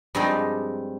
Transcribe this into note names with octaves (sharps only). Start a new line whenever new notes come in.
G2 F3 G3 G#3 C4 D#4